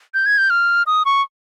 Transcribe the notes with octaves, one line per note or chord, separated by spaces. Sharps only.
G6
G#6
G6
F6
D#6
C#6